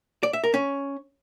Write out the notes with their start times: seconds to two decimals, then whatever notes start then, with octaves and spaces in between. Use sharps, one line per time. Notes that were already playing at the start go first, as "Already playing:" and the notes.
0.23 D5
0.33 E5
0.44 A#4
0.54 C#4